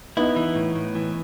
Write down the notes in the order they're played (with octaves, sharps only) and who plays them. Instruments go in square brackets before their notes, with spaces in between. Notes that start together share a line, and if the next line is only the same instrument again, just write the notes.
[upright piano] B3 D#4 [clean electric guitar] E4
[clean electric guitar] E3
A2
A2
E3